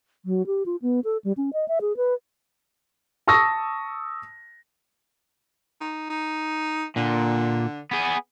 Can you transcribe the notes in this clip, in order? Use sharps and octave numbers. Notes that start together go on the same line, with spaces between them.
F#3
G4
F4
B3
A4
G3
C#4
D#5
E5
G#4
B4
A5 C#6 D#6 E6 A#6
D#4
D#4
A#2 D3
B3 G#4